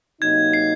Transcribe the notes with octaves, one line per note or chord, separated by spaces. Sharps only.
C3 F#3 A#3 D#4 G#6
C7